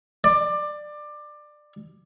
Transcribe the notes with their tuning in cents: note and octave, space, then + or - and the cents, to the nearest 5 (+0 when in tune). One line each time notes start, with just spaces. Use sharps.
D5 +20